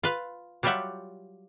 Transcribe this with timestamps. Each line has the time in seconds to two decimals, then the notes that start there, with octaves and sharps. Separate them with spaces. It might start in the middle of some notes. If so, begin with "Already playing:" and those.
0.03 F4 B4 F5
0.63 F#3 G3 F4 G4 E5 F#5